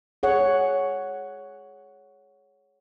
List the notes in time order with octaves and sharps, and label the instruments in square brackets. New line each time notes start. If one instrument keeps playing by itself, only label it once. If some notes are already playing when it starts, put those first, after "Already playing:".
[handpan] G#4 C#5 F#5